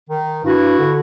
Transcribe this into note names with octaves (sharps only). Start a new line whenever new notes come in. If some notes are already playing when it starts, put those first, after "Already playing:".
D#3
G2 E4 F#4
D3